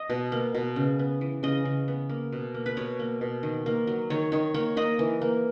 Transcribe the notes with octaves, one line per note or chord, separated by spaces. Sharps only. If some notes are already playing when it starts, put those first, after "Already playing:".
Already playing: D#5
B2
A#3
B2
C#3
B3
E3
C#3 D#5
C#3
B3
A#3
B2
A#3
B4
B2 C#5
A#3
B2
D#3
A#3
F#3
D#3 C#5
D#3 C#5
A#3 C#5
A#3 D#5
E3
A#3